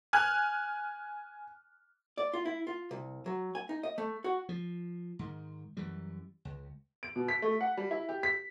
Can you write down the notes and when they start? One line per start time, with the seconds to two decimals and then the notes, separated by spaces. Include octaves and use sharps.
0.13 G#5 F6 F#6
2.17 D5
2.34 F4
2.45 E4
2.67 F4
2.91 C2
3.26 F#3
3.55 G#5
3.69 D#4
3.83 D#5
3.98 A3
4.24 F#4
4.49 F3
5.19 G#2 D#3
5.77 F#2 E3 G3
6.45 C#2
7.03 D7
7.16 B2
7.28 B6
7.42 A3
7.61 F#5
7.77 G3
7.91 E4
8.09 G4
8.23 B6